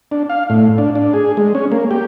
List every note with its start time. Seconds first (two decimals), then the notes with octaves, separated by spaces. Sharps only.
0.11 D4
0.30 F5
0.50 A2
0.78 D4
0.95 D4
1.14 G#4
1.37 G#3
1.55 C#4
1.72 A#3
1.91 G4